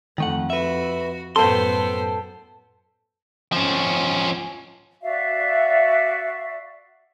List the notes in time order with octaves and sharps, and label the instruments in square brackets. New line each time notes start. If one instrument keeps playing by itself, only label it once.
[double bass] F2 [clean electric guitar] D#3 A3 F#5
[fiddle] F#4 [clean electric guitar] B4 E5
[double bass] F#2 A2 [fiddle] B3 C5 [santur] A4 G5 [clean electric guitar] C6
[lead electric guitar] F3 C#4
[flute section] F#4 D5 E5 F5